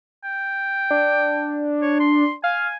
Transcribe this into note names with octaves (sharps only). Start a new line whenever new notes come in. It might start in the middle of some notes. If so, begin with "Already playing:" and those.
G5
D4
C#5
C6
F5 G#5